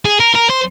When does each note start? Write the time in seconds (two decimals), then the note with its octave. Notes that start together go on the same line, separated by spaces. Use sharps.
0.05 G#4
0.20 A#4
0.35 A#4
0.50 C5